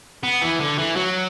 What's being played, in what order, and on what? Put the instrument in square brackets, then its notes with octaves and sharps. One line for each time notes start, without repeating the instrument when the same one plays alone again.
[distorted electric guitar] B3
E3
D3
E3
F#3